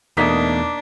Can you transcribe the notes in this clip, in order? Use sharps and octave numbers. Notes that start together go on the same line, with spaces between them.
E2 B2 A3 A#3 D4 D#4 D#5 B6